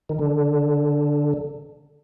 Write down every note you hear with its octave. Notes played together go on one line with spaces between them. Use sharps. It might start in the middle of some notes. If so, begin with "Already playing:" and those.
D#3
D3